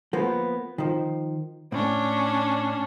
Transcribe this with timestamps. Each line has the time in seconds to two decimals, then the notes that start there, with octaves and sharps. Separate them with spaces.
0.13 F3 A#3 B3
0.78 D#3 F3
1.72 A2 C#4 D4